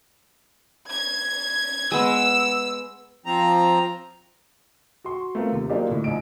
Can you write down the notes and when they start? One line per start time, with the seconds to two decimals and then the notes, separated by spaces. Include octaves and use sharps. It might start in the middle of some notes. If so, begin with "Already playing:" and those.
0.87 G#6
1.92 G#3 B3 E6
3.26 F3 C4 A#5
5.04 F#4 C6 C#6
5.35 A3 B3 C4 F4 A#4
5.52 D#2 C3
5.69 F#3 A#3 D4 D#4 F4 G4
5.89 D2 A2
6.04 A#1 D#4 D7